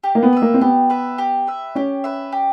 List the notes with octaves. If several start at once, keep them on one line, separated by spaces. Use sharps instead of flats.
G4
A#3
B3
B4 E5
A#3
C4
B3 G4
B4 E5
G4
B4 E5
C#4 G4
B4 E5
G4